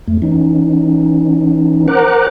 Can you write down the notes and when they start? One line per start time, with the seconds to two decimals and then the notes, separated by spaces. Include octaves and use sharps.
0.08 F2 A3
0.22 E3 C#4 D#4
1.88 A#4 C5 F#5 A#5 D6 F#6